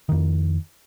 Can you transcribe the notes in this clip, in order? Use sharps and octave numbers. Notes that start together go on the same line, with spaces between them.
F2 D#3